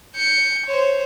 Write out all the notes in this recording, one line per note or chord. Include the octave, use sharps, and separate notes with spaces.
G6 C#7
C5 C#5